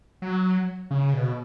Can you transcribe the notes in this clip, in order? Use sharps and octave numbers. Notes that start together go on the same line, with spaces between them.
F#3
C#3
B2